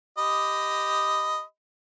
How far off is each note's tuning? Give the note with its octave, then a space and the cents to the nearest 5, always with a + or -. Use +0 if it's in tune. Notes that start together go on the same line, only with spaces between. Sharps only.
G4 +0 D#5 +0 B5 +15